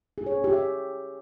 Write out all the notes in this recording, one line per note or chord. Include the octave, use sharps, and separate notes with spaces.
G#4
C#5
C#4
G4
E5